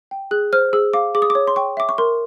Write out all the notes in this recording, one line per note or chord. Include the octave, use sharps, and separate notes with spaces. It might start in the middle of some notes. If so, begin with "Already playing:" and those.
G5
G#4 F#6
C5 F6
G#4 E6
F5 D6
G#4 D6
D#6
D6
C#5
C6
G5 C#6
E5 D6
C#6
A#4 C6